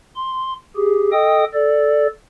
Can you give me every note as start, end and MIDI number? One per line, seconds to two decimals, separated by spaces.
0.16 0.53 84
0.76 1.12 67
0.76 1.12 68
1.12 1.44 69
1.12 1.44 75
1.12 1.44 79
1.12 1.44 87
1.54 2.07 69
1.54 2.07 74